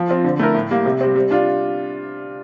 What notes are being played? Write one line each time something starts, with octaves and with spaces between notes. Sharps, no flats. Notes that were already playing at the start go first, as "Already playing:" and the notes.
Already playing: F3
C4 F4
D3
A3 E4 A#4
A2
G3 A#3
C3
G3 C4
G3
D4 F4